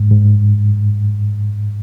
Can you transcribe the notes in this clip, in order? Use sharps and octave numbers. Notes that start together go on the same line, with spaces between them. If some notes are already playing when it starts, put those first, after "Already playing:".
Already playing: G#2
G#2